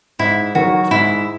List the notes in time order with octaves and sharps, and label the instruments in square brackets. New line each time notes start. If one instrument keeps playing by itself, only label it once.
[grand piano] G#2 [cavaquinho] E4
[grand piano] D#3 F#3 [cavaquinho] F#4
[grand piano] G#2 [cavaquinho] E4